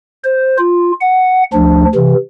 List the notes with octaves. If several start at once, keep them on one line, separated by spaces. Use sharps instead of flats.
C5
F4
F#5
D2 F3 D4
C3 E3